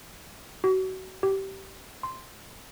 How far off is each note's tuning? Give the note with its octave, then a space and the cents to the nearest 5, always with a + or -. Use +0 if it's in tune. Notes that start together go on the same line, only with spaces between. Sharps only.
F#4 +30
G4 -20
C6 -5